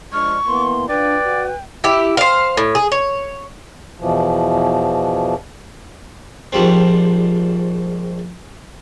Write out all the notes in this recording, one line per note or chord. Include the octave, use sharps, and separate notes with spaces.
F3 G#3 D4 C#6 F6
E3 A#3 B3 C6
D4 F4 B4 D5 G5
F#4
E4 G4
C5 F5
A2
G#4
C#5
E2 B2 E3 F3
A#1 G#2 F3 G3 C4